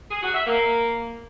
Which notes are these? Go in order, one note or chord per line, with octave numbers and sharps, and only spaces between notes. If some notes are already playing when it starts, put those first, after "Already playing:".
G#4
F#4
E5
A#3